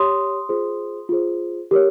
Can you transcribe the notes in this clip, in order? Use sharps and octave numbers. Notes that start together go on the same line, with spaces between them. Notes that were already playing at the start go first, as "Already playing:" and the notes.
Already playing: G4 C#5 C6 D#6
F4 G#4 C5
F4 G#4 C5
G4 A#4 C#5